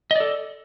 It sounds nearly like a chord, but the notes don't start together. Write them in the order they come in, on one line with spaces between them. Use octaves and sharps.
D#5 D5 A4